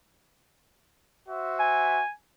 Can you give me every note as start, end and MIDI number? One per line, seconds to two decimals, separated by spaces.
1.27 2.00 66
1.27 2.00 72
1.27 2.00 76
1.59 2.10 80